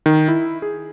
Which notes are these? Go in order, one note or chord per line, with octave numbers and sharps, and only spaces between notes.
D#3
E4
G#4